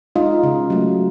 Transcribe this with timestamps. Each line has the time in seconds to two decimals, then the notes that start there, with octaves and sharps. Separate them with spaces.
0.16 G#3 D#4 F4
0.43 C#3
0.70 F#3 A3